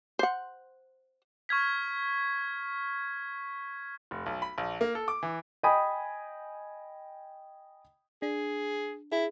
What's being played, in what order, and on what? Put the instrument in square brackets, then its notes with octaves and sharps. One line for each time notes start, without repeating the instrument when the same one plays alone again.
[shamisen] C5 F#5
[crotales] C#6 F6 G#6 B6
[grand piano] F1
B1
B5
A#1
A#3
A4
D6
E3
D#5 G5 G#5 B5 D#6
[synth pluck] D4 [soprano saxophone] G#4
[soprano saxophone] E4 [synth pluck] G#4